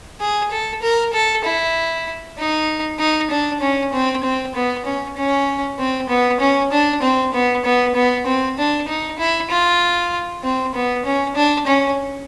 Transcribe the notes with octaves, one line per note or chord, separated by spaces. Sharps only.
G#4
A4
A#4
A4
E4
D#4
D#4
D4
C#4
C4
C4
B3
C#4
C#4
C4
B3
C#4
D4
C4
B3
B3
B3
C4
D4
D#4
E4
F4
C4
B3
C#4
D4
C#4